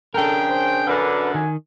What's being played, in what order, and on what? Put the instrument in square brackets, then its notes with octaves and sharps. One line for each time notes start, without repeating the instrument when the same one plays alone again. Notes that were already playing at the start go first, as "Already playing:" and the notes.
[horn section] C#3 G5 [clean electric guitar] D4 A#4 [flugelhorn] A4
[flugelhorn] C5
[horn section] F#2 D3 [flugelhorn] B4
[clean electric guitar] D#3 [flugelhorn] G#5